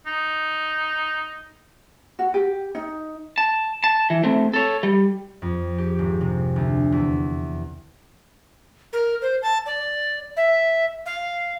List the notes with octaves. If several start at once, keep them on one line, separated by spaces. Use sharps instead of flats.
D#4
F#4
G4
D#4
A5
A5
E3
A3 C4
A4 C#5
G3
F2
G4
G#1
C3
D2
E2
A#4
C5
A5
D5
E5
F5